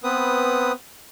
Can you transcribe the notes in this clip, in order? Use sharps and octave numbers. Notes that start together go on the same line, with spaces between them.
B3 C4 B4 D#6